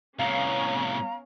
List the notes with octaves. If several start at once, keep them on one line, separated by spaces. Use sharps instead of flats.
C2 A2 B3 C#4 F5 A#5